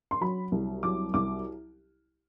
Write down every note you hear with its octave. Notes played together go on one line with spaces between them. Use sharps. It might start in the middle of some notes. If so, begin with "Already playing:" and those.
C6
F#3 B5
C2
F#3 D6
C2 D6